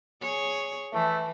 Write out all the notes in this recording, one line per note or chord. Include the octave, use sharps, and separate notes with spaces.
G#4 C#5
E3 A3